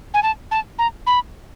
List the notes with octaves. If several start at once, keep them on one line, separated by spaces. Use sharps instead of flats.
G#5
A5
A5
A#5
B5